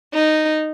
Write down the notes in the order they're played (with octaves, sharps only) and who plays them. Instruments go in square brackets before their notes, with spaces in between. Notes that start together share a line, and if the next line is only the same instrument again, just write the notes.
[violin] D#4